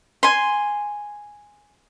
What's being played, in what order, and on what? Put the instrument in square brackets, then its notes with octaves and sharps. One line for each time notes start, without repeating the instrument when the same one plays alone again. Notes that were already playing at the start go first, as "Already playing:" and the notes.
[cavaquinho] G#5 C6